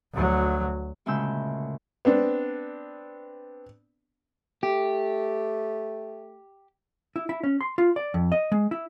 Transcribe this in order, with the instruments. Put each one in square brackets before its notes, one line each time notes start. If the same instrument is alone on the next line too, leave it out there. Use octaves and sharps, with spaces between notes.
[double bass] D2 F#3
[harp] D2 A#2 C#3 G#3 E6 G6
[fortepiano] B3 C4 D4
[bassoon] A3 [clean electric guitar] G4
[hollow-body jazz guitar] E4
E4
C#4
C6
F4
D5
F2
D#5
G#3
E4